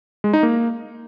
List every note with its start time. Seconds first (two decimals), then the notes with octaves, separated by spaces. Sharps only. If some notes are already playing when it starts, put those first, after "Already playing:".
0.24 G#3
0.33 D#4
0.43 A#3